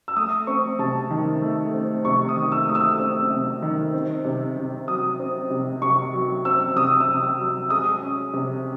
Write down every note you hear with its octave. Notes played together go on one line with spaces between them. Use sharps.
E6
A3 D#6
C4 C#6
C3 A5
D#3
A3
C4
C3 C#6
D#6
D#3
E6
A3 D#6
E6
C4
C3
D#3
C4
C3
C3
F#3 D#6
C4
C3
C3 C#6
F#3
C4 E6
C3 D#6
E6
C3
E6
F#3
G#3 D#6
C#4
C3